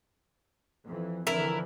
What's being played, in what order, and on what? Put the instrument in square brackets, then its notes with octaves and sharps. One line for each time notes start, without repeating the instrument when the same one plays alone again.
[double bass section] F2 E3
[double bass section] F2 D3 E3 [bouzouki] E4 A#4